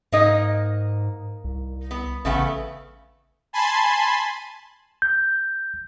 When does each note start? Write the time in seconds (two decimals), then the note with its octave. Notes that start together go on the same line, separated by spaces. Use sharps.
0.12 G#2 A#3 D#4 D#5
1.44 C2
1.91 B3
2.25 A1 C#3 A3 B3
3.53 G#5 A5 B5 C6
5.02 G6